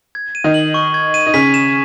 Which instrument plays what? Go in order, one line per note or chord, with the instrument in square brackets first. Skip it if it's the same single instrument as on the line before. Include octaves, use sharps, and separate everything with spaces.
[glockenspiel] G#6
D#7
[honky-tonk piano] D#3 D#4
[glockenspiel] F#7
C#6
G#6
D#7
[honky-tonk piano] D#4
[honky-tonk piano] C#3 C#4 [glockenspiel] B6
[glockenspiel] E7